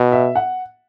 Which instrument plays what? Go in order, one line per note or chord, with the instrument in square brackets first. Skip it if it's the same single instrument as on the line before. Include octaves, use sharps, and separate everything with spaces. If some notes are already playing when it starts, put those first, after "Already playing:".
Already playing: [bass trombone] B2
[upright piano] E5
F#5